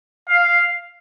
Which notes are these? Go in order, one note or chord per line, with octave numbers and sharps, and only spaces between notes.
F5